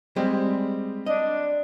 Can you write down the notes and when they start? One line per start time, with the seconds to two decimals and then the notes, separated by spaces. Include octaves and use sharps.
0.16 G3 G#3 C4 G4
1.06 D4 D#5